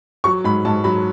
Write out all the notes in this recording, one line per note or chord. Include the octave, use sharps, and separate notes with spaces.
F#3 C#6
G#2 B5
G#2 A5
F#3 B5